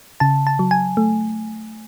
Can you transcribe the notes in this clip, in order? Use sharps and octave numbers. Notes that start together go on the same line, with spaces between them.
C#3 A5
A5
F#3
G#5
A3